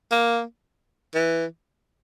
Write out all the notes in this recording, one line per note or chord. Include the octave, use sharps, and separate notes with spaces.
A#3
E3